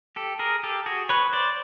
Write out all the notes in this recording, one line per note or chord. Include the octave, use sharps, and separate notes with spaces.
G4 A4
G#4 A#4
G4 A4
F#4 G#4
B4 C#5
C5 D5